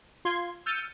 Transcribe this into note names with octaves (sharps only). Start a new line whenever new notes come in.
F4 C6 G#6
E6 F6 G6 A6 C#7 D#7